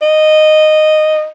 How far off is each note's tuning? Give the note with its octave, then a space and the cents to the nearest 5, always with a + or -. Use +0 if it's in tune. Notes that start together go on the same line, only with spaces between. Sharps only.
D#5 -10